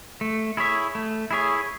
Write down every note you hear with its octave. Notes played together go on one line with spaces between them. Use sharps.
A3
E4 G#4 C#5 E5
A3
E4 G#4 C#5 E5